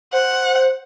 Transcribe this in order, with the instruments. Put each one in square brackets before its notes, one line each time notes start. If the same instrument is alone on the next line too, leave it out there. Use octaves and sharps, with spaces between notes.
[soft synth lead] C5 [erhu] F#5